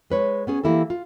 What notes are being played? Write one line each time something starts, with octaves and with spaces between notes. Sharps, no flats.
G#3 B4 C#5
B3 C#4 G#4
E3 A#3 E4 G4 A4
F4